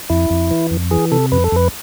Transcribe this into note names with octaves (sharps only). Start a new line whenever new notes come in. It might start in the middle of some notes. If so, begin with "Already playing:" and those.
F2 E4
F2
E3
F2
E3 G#4
C3 A4
F2 B4
A4
F2 B4